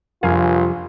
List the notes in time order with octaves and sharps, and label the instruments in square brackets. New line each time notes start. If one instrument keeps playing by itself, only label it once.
[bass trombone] A#1 [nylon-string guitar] F2 C3 G3 [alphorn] F4 [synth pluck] A#4 F5 G#5